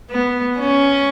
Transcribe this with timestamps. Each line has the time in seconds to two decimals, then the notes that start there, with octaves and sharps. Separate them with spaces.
0.10 B3
0.59 C#4